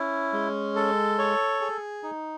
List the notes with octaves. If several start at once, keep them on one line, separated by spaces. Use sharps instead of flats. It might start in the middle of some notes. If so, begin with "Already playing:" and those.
Already playing: C#4 E4
G#3
A4
C#5
G#4
D#4